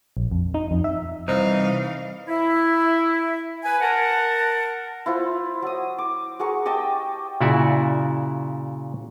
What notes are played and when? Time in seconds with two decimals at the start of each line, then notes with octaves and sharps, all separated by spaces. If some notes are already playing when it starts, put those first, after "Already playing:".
0.17 A#1
0.31 F2
0.54 D#4
0.71 F2
0.84 E5
1.28 C2 E3 D#4 C5 F5
2.28 E4
3.64 B4 G#5
3.81 A#4 F#5 A5
5.06 E4 F4 C5
5.62 F#3 D#6
5.98 D6
6.39 F#4 G#4 A#4 C#6
6.66 G4 D#5 G5 A5
7.41 A#2 C#3 E4 F#4 D5 E5